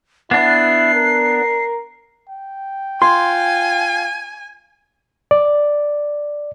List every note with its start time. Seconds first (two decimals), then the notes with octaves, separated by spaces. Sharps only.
0.31 B3 D4 E4 C7
0.94 A#4
2.29 G5
3.02 F4 G#5 C6
5.31 D5